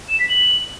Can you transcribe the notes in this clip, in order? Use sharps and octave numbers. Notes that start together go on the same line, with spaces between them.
E7
B6
F#7